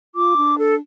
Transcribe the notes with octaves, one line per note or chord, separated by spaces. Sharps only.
F4 D6
D4
A4